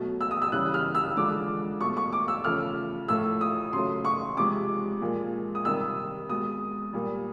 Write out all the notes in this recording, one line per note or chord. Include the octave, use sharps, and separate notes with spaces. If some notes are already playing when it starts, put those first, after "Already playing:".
Already playing: B2 F#3 A3
E6
D#6
E6
C#3 E3 G3 F#6
F6
E6
D3 F3 G#3 D6
B2 F#3 A3 C#6
C#6
D6
E6
C#3 F3 A3 F6
A2 F3 A3 E6
D#6
C#3 F#3 A3 C6
C#6
C3 F3 G#3 D6
A#2 F3 G#3
D#6
C3 D#3 G3 E6
B2 G#3 D#6
A#2 G3